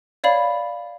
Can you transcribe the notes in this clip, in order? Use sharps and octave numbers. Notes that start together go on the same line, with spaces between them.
C#5 D5 F5 B5